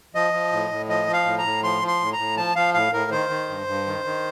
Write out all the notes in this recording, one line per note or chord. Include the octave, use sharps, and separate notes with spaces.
F3 D#5
F3
A2
A2
F3 D#5
F3
F5
A2
A#5
A2
F3 C6
F3
C6
A2
A#5
A2
F3 A5
F3 F5
A2 F5
A2 A#4
D#3 C5
D#3
G2
G2
D#3
D#3